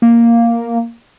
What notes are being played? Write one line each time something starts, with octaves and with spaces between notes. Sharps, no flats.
A#3